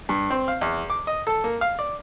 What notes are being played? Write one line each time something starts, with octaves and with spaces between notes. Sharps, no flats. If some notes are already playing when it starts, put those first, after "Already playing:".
G2
C4
F5
E2
D6
D#5
A4
A#3
F5
D5